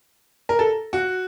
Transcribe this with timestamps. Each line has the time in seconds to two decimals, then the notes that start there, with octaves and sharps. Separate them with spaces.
0.49 A#4
0.59 A4
0.93 F#4